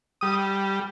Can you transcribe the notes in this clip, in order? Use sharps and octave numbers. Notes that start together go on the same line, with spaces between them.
G3 D#6